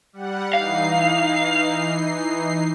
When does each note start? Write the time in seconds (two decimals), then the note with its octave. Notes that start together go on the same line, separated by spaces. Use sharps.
0.13 G3 F#5
0.53 E3 D#4 F5 C7